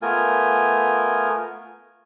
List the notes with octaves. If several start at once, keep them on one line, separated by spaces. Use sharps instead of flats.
A3 B3 F4 A#4 G#5